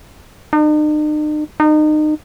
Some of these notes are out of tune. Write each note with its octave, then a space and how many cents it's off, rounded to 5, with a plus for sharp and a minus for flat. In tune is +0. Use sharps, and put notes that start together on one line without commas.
D#4 -45
D#4 -30